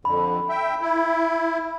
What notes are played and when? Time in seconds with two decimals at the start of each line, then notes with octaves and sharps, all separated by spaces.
0.05 F2 D3 B5
0.49 E5 G5
0.81 E4